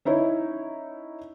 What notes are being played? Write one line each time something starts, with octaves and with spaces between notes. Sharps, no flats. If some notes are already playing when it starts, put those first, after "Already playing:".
C#4 D#4 E4 C#5